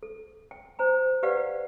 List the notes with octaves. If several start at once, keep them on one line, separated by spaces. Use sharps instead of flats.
A4
G5
C5 G#5 A#5
G4 B4 D5 F5 F#5